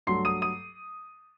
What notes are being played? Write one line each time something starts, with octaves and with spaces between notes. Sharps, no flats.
G2 F#3 A3 C6 C7
D#6 D#7
D#6 D#7